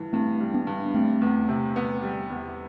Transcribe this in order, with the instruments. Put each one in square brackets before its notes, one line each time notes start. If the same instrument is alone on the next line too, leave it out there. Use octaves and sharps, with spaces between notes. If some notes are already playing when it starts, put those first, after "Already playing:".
Already playing: [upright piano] G2 E3
[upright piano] G2 [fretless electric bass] A3 C4
[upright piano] G3
[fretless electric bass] B3 D4
[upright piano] G2
[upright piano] G3 [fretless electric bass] A3 C4
[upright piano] E2
C3
B3
G3
E2